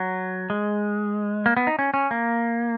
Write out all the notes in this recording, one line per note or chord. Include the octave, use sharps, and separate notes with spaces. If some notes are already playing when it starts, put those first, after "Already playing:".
Already playing: F#3
G#3
A#3
B3
D#4
C#4
C#4
A#3